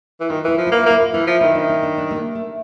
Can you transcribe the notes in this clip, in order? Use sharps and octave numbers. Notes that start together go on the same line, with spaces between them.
E3
D#3 F4
E3 E4
F3
A#3 E4
F4
A#3 E4
F4
E3 E4
F3
D#3 E4
D4
C#4
D4
D4
A3
A#3
A3